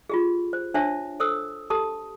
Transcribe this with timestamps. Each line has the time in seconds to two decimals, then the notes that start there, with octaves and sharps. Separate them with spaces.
0.10 F4 G4 G#4
0.53 C5
0.74 D4 C5 C#5 E5 A5
1.20 A4 C5 D#6 E6
1.70 G4 A4 A5 D#6